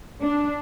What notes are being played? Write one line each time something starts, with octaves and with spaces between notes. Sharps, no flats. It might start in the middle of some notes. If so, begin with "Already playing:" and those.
D4